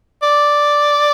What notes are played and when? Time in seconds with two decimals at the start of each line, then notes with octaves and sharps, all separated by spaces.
0.22 D5